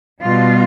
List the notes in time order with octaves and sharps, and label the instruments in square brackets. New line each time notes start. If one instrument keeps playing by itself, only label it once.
[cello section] B2 G3 F4